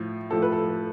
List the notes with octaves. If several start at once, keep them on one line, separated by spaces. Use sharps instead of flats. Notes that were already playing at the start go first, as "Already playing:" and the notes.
Already playing: A2 F3
A2 F3 A4
B4
A4